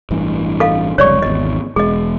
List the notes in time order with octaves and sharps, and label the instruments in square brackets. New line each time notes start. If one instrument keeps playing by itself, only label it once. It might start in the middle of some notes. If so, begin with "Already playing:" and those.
[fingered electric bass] A1 G2 E3
[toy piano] A4 D#5 F5
[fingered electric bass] F1 C#2 G3 [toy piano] C#5 D5 C#6
[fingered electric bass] G#1 E2 [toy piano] D#5
[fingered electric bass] E1 G#3 [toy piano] G#4 D#5